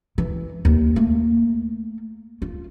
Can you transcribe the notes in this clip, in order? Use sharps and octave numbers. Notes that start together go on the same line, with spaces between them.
E3
D#2
A3 A#3
F4